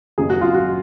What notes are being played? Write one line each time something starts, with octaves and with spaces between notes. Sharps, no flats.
F#1 F#2 C#3 F#3 G#4
F#4
F4
F#4